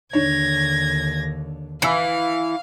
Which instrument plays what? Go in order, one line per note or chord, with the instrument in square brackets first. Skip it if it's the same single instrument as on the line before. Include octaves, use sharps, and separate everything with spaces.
[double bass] D#2 D3 [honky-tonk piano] D4 C#5 [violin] G#6 A#6
[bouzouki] E3 [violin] F5 [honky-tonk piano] G#5 B5 E6